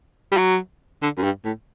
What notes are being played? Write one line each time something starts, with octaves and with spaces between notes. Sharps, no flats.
G3
F#3
D3
F#2
G2
A2